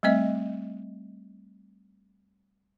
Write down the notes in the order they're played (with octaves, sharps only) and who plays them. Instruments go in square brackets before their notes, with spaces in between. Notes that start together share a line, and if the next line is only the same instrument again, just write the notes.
[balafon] G3 A3 C4 D#5 E5